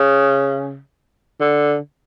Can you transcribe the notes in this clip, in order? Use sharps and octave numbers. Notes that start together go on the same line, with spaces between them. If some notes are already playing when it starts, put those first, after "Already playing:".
Already playing: C#3
D3